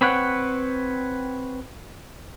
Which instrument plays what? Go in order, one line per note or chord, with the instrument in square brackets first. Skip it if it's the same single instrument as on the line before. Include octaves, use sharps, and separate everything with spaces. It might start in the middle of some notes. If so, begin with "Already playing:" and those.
[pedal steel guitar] C4 B4 C#5 F#5 G5